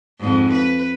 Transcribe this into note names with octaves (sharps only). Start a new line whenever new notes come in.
F2 G#2
B4